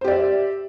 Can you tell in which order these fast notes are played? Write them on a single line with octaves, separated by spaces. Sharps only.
C5 G4 D5 E5